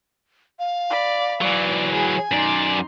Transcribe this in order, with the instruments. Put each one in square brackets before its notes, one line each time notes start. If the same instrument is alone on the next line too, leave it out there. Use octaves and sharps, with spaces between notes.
[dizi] F5
[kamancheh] D5 B5
[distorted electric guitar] E3 F#3 [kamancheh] D5
[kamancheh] G#4 [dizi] G#5
[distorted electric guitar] F#2 D5 [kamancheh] D#4 C6